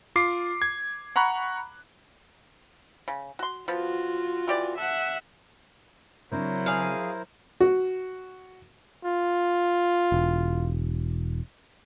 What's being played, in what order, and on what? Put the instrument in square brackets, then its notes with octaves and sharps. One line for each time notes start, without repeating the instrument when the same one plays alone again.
[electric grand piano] F4 D6 C7
G#6
F#5 A#5 B5 C#6 F#6
[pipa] C#3
F#4 C6
[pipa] F3 B3 [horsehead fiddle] F4 F#4
[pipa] E3 G4 D5
[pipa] A4 [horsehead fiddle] E5 F#5
[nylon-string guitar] C#3 C4 D4 [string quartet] F#3 [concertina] E4 A#4 C5
[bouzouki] G#4 F5
[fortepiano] F#4
[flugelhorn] F4
[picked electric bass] E1